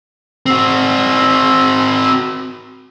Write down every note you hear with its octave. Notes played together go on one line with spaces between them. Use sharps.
C4 F#4